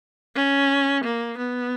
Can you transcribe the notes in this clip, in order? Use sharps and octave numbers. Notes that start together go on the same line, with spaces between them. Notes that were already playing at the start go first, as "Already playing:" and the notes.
C#4
A#3
B3